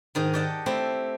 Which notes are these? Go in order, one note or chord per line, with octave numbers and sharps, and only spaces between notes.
G#2 D#3 D#5
G4 D5 D#5 F#5 A5
A3 C4 E4 G4